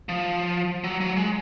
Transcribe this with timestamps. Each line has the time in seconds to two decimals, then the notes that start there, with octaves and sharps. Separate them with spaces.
0.09 F3
0.84 F#3
1.00 F#3
1.16 G#3